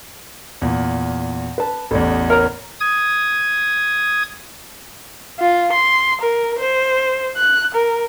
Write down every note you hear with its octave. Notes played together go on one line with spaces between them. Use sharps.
E2 A#2
B4 A5
A1 E2 A4 D5
A#4 C#5 A#5
D#6 G#6
F4
C6
A#4
C5
F#6
A#4